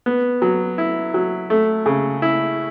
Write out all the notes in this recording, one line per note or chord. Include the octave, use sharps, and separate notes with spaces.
B3
F#3
E4
F#3
A3
C#3
E4